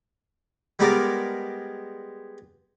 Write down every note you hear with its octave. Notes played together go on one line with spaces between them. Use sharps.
G3 G#3 B3 A#4 D5